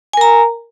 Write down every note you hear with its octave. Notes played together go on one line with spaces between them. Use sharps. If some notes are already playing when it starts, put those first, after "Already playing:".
A#4 G#5 A#5